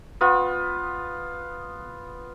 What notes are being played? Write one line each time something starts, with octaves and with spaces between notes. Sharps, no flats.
B3 F4